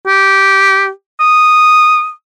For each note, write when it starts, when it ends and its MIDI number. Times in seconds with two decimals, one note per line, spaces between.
0.07 0.89 67
1.20 2.11 87